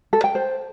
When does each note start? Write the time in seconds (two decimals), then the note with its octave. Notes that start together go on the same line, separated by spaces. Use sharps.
0.13 A4
0.24 G5
0.35 C5